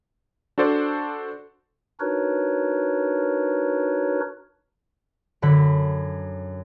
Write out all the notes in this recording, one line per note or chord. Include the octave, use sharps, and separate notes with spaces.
D4 F#4 A4 C5 D5
D4 D#4 F#4 A#4 B4 C#5
F#2 D3 B5